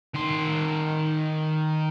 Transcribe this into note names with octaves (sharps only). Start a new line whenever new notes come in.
D#3 C6